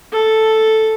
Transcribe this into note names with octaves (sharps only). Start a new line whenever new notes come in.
A4